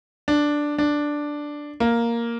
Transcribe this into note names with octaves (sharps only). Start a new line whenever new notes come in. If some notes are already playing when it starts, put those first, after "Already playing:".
D4
D4
A#3